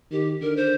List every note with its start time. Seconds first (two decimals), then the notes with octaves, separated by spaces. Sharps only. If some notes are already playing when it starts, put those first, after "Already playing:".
0.12 D#3 G4
0.42 D3 A#4
0.56 C5